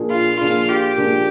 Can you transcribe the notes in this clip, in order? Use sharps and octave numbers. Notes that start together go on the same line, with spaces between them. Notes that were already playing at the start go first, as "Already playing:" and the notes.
Already playing: A#2 F3 A#3 D4 G#4
F4
A#2 F3 A#3 D4 F4 G#4
G4
A#2 F3 A#3 D4 G#4